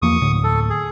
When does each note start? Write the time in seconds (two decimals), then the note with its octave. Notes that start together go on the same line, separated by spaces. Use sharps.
0.02 E2 F3 A#3 C#6 D#6
0.22 D2 A2 D3
0.44 A4
0.70 G#4